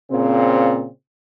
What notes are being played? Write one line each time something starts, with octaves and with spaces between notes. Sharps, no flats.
A#2 C#3 C4